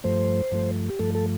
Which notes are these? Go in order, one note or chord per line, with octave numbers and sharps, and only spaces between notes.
G2 F3 A3 C5
G2 F3 A3
G4
G2 F3 A3 A4
A4